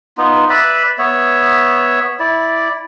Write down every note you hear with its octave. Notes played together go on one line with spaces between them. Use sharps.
B3 D#4 F4
B4 D5 E5 B5
B3 C#5 E5
E4 D5